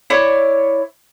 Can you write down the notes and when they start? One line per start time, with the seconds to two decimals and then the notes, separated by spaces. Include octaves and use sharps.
0.10 E4 C#5 D5